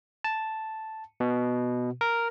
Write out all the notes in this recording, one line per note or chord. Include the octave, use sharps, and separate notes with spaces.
A5
B2
A#4